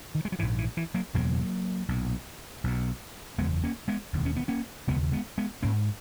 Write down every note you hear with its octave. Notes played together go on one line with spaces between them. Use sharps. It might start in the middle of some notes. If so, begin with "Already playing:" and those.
D#3
G#3
F#3
A#1 G#2 E3
E3
E3
F#3 A#3
F#1 E2 B2 F#3 A#3
B1 A#2
B1 B2
F#1 E2 C#3 G#3 B3
A#3 C#4
G#3 B3
E1 D#2 C#3
C#4
B3
A#3 C#4
E1 D#2 C#3 G#3 B3
G#3 B3
G#3 B3
G#1 A#3 C#4
G#2